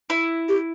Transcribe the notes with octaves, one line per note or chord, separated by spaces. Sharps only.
E4
G4